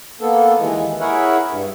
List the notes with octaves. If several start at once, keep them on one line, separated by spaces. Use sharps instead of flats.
A#3 B3 A4
D#2 E3 G#3
E4 G#4 A#4 C#5 E5 F#5
G2